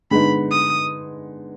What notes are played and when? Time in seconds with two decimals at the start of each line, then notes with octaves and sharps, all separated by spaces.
0.11 D3 G#3 B3 D#4 B5
0.51 D#6